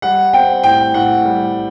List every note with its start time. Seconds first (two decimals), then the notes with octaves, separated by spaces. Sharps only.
0.02 G3 F#5
0.33 C4 G5
0.63 A2 G5
0.94 A2 F#5
1.25 G3